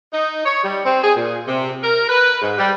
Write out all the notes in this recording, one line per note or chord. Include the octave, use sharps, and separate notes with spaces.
D#4
C#5
G3
C4
G#4
A#2
C3
A#4
B4
G#2
G3